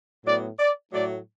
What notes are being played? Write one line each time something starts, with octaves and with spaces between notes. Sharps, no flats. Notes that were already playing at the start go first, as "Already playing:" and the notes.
A2 F#3 B3 D5
D5
A2 F#3 A3 D5